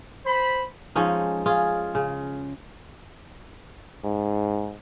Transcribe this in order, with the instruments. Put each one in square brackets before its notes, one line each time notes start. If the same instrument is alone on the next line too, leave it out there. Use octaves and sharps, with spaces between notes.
[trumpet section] C5 B5
[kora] F3 G#3 C#4 D#4
C#4 F4 G#4
C#3
[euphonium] G#2